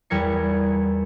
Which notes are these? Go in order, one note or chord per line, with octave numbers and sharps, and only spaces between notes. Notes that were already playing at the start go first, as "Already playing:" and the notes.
E2 G3 A#4 G#6 C#7